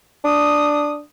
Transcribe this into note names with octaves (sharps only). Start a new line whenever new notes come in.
D4 D#6